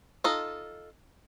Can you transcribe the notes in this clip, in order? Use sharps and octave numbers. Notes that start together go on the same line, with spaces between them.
D#4 F4 A4 D#5